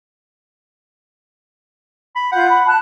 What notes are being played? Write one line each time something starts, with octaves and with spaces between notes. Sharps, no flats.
B5
F4 F#5 G6
B5
A5 F#6